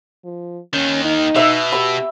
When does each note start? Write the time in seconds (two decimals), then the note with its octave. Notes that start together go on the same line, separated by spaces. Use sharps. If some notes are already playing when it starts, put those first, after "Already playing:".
0.24 F3
0.73 D#2 D#3 C#4
1.05 D#4
1.36 B2 E5 E6
1.72 G4 B5